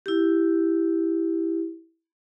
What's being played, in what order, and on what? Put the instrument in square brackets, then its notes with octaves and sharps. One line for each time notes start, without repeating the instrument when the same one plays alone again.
[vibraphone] E4 G4